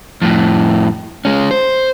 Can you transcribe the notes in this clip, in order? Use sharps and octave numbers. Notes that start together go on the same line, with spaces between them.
F2 A2
G#3 C#4
C5